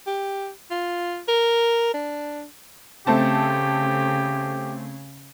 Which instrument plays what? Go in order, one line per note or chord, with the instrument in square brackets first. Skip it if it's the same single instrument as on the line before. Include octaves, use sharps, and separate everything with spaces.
[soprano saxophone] G4
F4
A#4
D4
[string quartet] C#3 [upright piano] A3 C4 A5 [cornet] G4